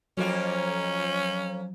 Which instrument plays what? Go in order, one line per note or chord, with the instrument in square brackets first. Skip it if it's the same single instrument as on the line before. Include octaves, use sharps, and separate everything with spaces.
[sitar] F2 A#3 F4 [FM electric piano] F3 F#3 [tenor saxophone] C#4